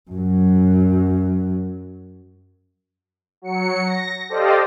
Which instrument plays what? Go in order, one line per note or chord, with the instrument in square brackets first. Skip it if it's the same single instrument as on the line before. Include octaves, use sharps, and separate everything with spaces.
[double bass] F#2 F#3
[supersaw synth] F#3 C#7
A#6
G4 A4 C5 D5 D#5 F5